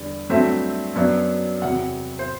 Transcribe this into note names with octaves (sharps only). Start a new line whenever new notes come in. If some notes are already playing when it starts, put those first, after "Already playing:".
Already playing: E2 D3 G3
G2 F#3 A3 C4 E5
F#2 F#3 B3 D4
E2 C3 F#3 F#5
C5